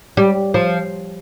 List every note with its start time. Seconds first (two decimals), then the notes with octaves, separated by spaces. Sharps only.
0.17 G3
0.54 F3